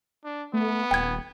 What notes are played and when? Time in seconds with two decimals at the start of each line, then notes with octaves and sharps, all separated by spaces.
0.24 D4
0.54 A3 B3
0.91 D#1 G5 G#6